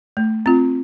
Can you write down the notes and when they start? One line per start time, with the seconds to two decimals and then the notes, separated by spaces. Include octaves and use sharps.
0.17 A3
0.46 C4 F4